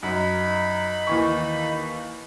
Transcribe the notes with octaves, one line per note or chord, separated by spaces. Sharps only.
F#2 D#4 B5
D#2 E3 C#6